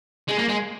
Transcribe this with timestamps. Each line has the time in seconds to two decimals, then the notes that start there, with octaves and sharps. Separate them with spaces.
0.29 G#3
0.39 A#3
0.49 G#3